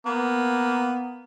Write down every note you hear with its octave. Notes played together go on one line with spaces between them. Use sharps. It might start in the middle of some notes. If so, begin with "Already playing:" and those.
A#3 B3